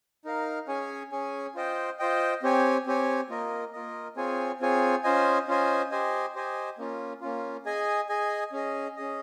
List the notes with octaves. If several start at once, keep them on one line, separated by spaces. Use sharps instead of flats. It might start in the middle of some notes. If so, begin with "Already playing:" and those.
D#4 A#4 F5
C#4 G#4 C#5 G#5
C#4 G#4 C#5 G#5
F4 C5 D#5 G5
F4 C5 D#5 G5
C4 G4 C#5 G#5
C4 G4 C#5 G#5
A#3 F4 A#4 D#5
A#3 F4 A#4 D#5
C4 F4 G#4 C#5 G#5
C4 F4 G#4 C#5 G#5
C#4 F4 C5 D#5 G#5
C#4 F4 C5 D#5 G#5
G4 C5 D#5 G#5
G4 C5 D#5 G#5
A#3 C#4 F4
A#3 C#4 F4
G#4 D#5 G#5
G#4 D#5 G#5
C#4 G#4 D#5
C#4 G#4 D#5